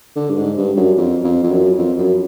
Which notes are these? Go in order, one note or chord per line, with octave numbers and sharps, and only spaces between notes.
D3
G2
G#2
G2
F#2
F2
F2
F2
F#2
F2
F#2